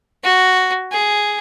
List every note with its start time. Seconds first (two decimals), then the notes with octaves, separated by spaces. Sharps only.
0.24 F#4
0.92 G#4